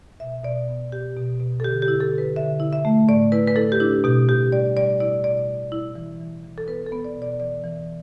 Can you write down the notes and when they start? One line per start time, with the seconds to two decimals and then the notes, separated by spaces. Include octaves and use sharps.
0.20 B2 E5
0.44 B2 D5
0.68 B3
0.92 B2 G4
1.17 B2
1.40 B2
1.60 A4
1.64 D3 G4
1.82 G4
1.88 E4
2.00 A4
2.13 D3
2.18 B4
2.36 D3 E5
2.60 E4
2.73 E5
2.85 A3
3.08 A2 D5
3.32 E4 B4
3.47 B4
3.56 E4 A4
3.72 G4
3.80 D4 E4
4.04 B2 G4
4.28 B2 G4
4.52 G3 D5
4.77 G3 D5
5.00 E4 D5
5.24 B2 D5
5.48 G3
5.72 E4
5.96 E3
6.20 E3
6.44 E3
6.58 A4
6.68 B3 B4
6.86 A4
6.92 B3
7.05 D5
7.16 B2
7.22 D5
7.40 E3 D5
7.64 E3